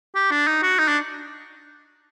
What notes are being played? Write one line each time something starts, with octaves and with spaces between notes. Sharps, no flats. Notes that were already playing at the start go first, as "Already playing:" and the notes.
G4
D4
D#4
F#4
D#4
D4